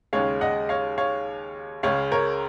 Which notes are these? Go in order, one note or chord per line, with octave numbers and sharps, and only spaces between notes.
D#2 C#3 G#3 C#5 F5
D#5 F#5
C#5 F5
C#5 F5
C#2 C#3 G#3 C#5 F5
A#4 C#5